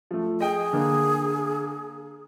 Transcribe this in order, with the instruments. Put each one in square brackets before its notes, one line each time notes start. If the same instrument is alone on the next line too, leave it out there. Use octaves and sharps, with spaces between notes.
[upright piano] F3 A3
[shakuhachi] G#4 [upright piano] D#5 G5
[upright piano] D3 A#3